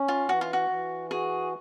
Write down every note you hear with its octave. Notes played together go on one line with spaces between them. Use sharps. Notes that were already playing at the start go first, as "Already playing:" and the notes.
Already playing: C#4
F4
E3 F#4
F4
F#4
E3
F#4 G#4